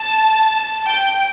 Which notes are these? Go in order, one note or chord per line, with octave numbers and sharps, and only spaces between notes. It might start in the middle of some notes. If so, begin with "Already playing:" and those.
Already playing: A5
G5